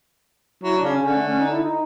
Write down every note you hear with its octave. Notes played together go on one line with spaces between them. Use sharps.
F#3 E4
D4
C#3
C#4
D3 C#4
A3
C#4
D#4
E4
D#4